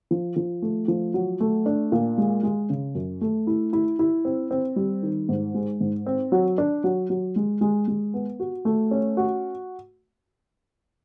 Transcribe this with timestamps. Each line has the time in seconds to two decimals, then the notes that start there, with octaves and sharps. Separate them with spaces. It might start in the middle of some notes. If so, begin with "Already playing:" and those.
0.11 F3
0.36 F3
0.62 A3
0.88 F3
1.14 F#3
1.40 A3
1.66 D4
1.92 A#2
2.18 G#3
2.43 G#3
2.70 C#3
2.95 F#2
3.21 A3
3.47 E4
3.73 E4
3.99 E4
4.25 C4
4.51 C4
4.76 G3
5.03 D#3
5.29 G#2
5.54 G#3
5.81 G#2
6.06 C4
6.32 F#3
6.58 D4
6.84 F#3
7.10 F#3
7.36 G#3
7.61 G#3
7.88 G#3
8.14 B3
8.40 F#4
8.65 A3
8.91 C#4
9.17 F#4